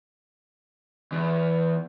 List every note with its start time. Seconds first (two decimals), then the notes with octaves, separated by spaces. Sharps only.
1.12 E2